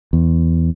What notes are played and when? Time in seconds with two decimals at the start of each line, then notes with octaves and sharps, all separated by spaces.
0.13 E2